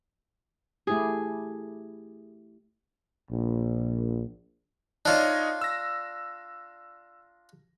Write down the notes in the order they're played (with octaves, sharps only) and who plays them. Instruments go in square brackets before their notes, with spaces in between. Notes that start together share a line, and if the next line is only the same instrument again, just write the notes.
[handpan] A3 E4 G4 [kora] G#4
[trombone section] A#1
[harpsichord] D4 F4 [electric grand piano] D#4 C#5 D#5
[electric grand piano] E6 A#6